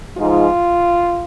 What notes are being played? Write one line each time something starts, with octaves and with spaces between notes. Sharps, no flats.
G#2 F3 G#3 D#4 F4